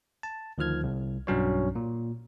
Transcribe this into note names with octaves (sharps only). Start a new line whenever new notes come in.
A5
D2 D#3 F3 F6 G#6
C2
B1 G2 F#3 C#4 D4 C#5
A#2